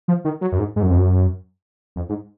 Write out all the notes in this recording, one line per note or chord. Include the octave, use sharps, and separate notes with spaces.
F3
D#3
F#3
F#2
G#2
G#2
F#2
F2
F#2
F2
G#2